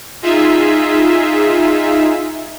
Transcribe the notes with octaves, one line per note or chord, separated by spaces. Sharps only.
D#4 F4 G#4 E5